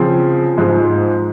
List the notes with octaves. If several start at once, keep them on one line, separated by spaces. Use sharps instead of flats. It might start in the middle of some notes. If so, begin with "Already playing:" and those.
Already playing: C#3 F3 C4
G#2 F3 G#3